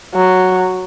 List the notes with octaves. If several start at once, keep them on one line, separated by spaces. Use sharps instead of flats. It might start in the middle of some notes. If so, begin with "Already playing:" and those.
F#3